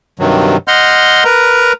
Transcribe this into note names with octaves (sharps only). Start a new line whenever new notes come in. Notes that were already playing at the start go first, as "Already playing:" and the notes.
G2 C3 D#3 F#3
D#5 F#5 C6 F6 G6
A#4 B4 A#5